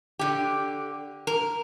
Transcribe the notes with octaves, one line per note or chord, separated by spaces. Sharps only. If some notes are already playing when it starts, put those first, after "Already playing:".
D3 G4
A#4